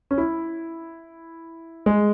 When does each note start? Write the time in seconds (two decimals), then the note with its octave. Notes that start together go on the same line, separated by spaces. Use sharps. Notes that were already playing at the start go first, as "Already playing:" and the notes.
0.11 C#4
0.18 E4
1.86 G#3 G#4